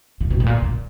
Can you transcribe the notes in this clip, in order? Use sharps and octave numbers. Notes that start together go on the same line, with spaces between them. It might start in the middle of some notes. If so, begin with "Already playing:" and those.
C3
B2
A2
A#2
A#2